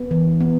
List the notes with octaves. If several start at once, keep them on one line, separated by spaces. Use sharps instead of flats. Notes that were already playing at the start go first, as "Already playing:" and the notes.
Already playing: B3
E3
B3